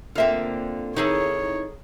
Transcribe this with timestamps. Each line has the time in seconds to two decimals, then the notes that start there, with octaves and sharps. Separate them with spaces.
0.15 D3 A#3 C4 F4 E5
0.96 D#3 D#4 E4 G#4 A4 C#5